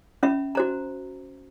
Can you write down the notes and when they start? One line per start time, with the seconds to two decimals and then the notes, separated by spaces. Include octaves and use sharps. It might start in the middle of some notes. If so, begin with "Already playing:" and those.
0.23 C#4 E5 B5
0.55 F#4 C5 A#5